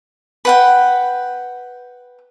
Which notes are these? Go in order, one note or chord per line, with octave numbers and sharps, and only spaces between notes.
B4 F#5 G5